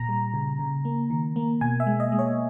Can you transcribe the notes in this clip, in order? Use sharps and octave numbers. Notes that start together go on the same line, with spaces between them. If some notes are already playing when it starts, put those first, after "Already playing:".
Already playing: A#2 A#5
G3
C#3
C#3
A#3
D#3
A#3
B2 G#5
E5
G#3
D#5
G#3
C#5